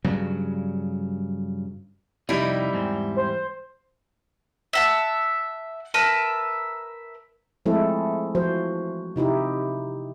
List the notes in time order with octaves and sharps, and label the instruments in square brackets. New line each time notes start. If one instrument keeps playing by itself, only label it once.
[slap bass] G2 C#3 F#3
[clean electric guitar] F2 C3 D#4 [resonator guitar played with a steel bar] G3 E4
[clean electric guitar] E2 G#2 C4
[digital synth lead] C5
[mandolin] E5 F#5 A5
A#4 B4 E5 A5
[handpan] F3 G#3 A3 C4 E4 A4
E3 F3 F#4 C5
C3 D#4 E4 G4